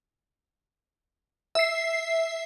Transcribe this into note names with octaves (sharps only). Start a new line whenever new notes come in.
E5 C7